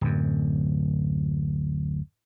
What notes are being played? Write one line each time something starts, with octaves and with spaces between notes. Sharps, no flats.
D1 F#2